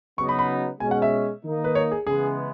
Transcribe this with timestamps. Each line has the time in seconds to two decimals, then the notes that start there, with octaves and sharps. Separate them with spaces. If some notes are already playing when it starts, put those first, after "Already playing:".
0.18 C#3 F#3 B3 D#4 C#6
0.29 B5
0.39 B5
0.80 B2 G#3 C#4 G#5
0.91 F#5
1.02 E5
1.44 D#3 A#3 D#4
1.64 B4
1.75 C#5
1.92 G#4
2.07 C#3 E3 G#3 B3 G#4